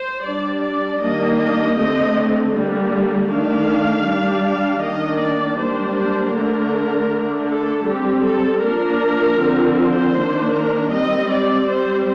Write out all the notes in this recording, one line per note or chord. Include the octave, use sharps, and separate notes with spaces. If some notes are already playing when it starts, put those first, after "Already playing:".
Already playing: C5
G3 D4 D5
D5
D#3 G3 A#3 D4 D#5
D#5
D3 A3 C4 D#5
D3 G3 A#3
D#3 A3 D4 F5
G3 D4
F5
D#3 A#3 D4 D#5
D5
G3 A#3 D4 C5
C5
D3 A3 D4 A#4
D3 A3 D4
A4
G3 G4
C4
A4
F3 A#3 D4 A#4
D3 F3 C4
C5
D#3 A#3 D4
A#4
G3 C4 D#5
D5
G3 C4 C5